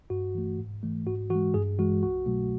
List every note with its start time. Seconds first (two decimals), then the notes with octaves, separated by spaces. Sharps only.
0.10 G2 F#4
0.35 E3 A3
0.59 G#2
0.83 E3 A3
1.06 G#2 F#4
1.30 E3 F#4
1.35 G#3
1.54 G2 G#4
1.78 E3 G#3 F#4
2.03 C2 F#4
2.26 B2 F#3 A3